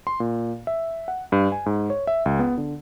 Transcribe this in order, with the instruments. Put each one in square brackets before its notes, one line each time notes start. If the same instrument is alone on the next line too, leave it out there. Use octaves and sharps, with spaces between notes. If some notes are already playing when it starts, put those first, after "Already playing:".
[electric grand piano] C6
A#2
E5
F#5
G2
G#5
G#2
C#5
E5
C#2
B3
D3